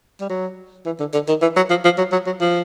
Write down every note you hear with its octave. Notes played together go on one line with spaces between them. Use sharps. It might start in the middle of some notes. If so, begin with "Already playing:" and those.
G3
F#3
E3
D3
D3
D#3
E3
F#3
F3
F3
F#3
F#3
F#3
F3